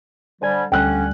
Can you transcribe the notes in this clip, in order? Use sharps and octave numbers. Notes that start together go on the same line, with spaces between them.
D3 G3 C5 G#5 G#6
D2 D3 G3 C#4 G5 F#6